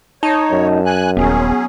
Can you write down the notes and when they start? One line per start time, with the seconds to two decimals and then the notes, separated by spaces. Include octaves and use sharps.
0.23 D#4 C#5 A5
0.52 F#2
0.86 G#5 F#6
1.17 D#1 F#3 B3 C#4 G#4